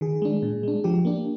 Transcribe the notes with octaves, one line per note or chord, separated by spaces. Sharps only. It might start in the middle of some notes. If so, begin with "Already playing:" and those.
D#3 G#4
G#3 D4
A#2
G#3 D4
F3 G4
A#3 D4